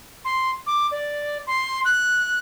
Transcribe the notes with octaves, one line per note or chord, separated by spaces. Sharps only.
C6
D6
D5
C6
F#6